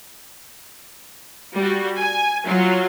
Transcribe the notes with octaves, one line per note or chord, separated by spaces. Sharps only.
G3 F#4
G#5
F#3 F4